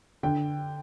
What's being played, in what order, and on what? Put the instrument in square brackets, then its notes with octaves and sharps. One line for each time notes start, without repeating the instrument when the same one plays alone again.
[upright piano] D3 G5